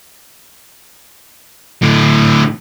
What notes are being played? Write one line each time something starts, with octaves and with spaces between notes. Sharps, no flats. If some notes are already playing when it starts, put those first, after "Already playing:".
A2 D3